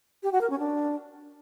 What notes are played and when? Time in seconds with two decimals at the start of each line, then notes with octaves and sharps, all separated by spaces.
0.23 G4
0.32 F#4
0.41 A#4
0.50 C#4
0.59 D4